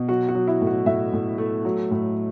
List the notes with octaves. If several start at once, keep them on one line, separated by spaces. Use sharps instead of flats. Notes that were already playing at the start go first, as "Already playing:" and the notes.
Already playing: B2
F#3 F#4
F#4
F#3
E4
A2
F#4
A2 E5
A2
A3
F#3
A2